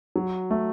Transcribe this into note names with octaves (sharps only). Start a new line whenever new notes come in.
F#3
A3